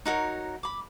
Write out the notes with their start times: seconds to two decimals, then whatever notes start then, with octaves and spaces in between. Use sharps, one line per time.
0.05 D#4 F#4 A#4 C#5
0.63 B5 D6